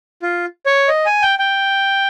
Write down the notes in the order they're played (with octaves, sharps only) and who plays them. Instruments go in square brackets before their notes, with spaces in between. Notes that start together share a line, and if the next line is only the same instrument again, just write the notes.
[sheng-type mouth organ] F4
C#5
D#5
G#5
G5
G5